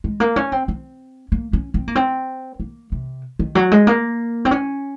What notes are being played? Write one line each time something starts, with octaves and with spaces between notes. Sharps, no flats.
G#3
A#3
C#4
C4
C4
A#3
C#4
C4
A#3
C4
A#3
C3
D#3
F#3
G#3
A#3
C4
C#4